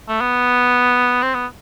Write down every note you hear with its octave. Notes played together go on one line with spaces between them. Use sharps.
A3
B3
C4
B3